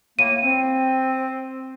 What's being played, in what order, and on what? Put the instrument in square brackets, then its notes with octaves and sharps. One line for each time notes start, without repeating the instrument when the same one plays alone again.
[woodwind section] A2 A#3 [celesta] D#7
[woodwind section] C4